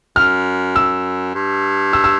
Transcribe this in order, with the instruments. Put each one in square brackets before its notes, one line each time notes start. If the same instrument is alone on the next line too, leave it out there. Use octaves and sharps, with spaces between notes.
[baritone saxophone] F#2 [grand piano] F6
[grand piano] E6
[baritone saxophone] G2
[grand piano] E6
E6